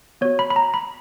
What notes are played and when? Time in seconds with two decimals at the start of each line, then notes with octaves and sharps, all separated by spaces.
0.21 B3 F#4 C#5
0.39 B5
0.50 B5
0.56 A#5
0.74 B5